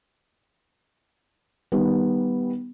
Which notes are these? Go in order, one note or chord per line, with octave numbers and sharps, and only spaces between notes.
D#3 G3 B3